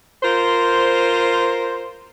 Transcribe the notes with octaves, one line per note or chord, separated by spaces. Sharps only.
F4 A#4 C5